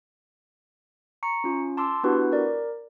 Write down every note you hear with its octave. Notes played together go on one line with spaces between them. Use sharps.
A#5 C#6 C#7
C#4 F4
A5 C6 D6 E6
B3 D4 E4 F#4 G4 B4
A#4 D5